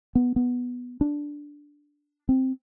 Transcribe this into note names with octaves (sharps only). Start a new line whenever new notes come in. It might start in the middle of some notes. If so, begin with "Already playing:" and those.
B3
B3
D4
C4